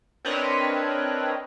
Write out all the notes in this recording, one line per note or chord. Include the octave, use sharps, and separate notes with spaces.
C4 D4 A#4 B4 C#5 D#5